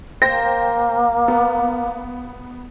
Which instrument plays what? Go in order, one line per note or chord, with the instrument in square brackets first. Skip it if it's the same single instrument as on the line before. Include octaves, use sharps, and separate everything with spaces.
[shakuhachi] A#3 [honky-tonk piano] C5 G5 A#6
[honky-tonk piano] B3